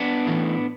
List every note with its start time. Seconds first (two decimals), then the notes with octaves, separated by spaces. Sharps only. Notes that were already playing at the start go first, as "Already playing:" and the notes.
Already playing: B3 D4
0.26 A2 E3 A3